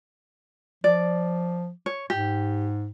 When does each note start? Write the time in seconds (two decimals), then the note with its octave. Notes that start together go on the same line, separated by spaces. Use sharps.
0.84 F3 D5
1.86 C#5
2.10 G#2 G4